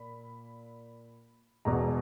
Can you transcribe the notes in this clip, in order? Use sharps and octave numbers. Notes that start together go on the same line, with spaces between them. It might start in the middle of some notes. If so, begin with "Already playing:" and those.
Already playing: A#2 B5
E1 E2 B2 G#3 A#5